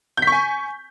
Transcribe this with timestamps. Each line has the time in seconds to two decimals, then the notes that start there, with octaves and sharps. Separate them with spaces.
0.17 G6
0.22 B6
0.27 C#6
0.32 G#5